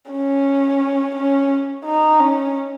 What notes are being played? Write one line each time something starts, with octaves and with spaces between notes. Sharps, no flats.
C#4
C#4
D#4
C#4